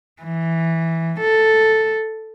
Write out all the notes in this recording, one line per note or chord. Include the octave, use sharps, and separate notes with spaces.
E3
A4